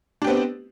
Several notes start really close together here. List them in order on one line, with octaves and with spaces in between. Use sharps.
D4 G4 B3 C4